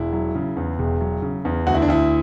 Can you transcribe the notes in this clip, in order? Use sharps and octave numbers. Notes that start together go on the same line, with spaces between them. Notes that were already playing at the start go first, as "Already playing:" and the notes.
Already playing: E1 E4
F#3
C#3
E2
E1
F#3
C#3
E2
D2 F#4
E4
D4
D2 E4